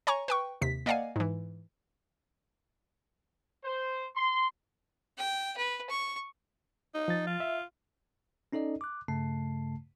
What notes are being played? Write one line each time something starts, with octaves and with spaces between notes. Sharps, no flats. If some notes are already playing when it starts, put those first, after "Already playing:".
C#5 G#5 A#5 C#6
B4 G5 C#6
D#2 C3 B6
A#3 D5 D#5 F5 F#5 G#5
G#2 E3
C5
C6
G5
B4
C#6
D#4
F3 A6
F4
E5
C#4 D#4 A4 D5 D#5
D6 F#6
G2 C#3 A3 A5 C7